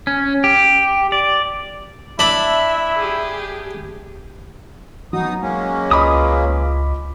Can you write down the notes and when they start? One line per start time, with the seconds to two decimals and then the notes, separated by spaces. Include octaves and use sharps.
0.07 C#4
0.44 G4
1.12 D5
2.19 D4 E4 E5 A5 B5
2.99 G4 G#4
5.13 B2 F#3 D#4 D#6
5.41 G#3 A#3 C#4
5.91 C#2 F4 B4 D#5 B5 D6 D#6